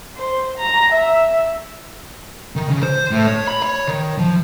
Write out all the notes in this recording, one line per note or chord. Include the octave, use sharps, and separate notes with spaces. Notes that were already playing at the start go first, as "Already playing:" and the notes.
C5
A#5
E5
D#3
C#3
C5
A2
C#5
B5
C#5
D#3
F3